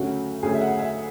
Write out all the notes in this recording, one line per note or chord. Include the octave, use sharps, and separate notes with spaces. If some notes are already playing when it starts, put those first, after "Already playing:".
Already playing: D2 C#3 F#3 A3 C#4 F#4
D2 C#3 F#3 A3 C#4 G#4
E5
F#5
E5